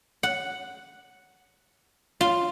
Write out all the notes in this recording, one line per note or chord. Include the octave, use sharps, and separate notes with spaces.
F#5
F4